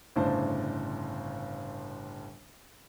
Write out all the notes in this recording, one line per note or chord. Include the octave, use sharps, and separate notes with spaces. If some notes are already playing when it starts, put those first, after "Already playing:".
G1 A2 C#3 D4 C5 A5